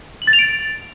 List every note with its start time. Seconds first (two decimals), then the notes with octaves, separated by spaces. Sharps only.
0.22 F#7
0.27 A6
0.33 F7
0.39 D7